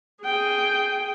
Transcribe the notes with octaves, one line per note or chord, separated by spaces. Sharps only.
G#4 G5